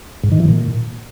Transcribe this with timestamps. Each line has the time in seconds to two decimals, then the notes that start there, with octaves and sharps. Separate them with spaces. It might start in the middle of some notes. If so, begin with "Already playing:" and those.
0.23 G#2
0.32 D#3
0.40 E3
0.48 A#2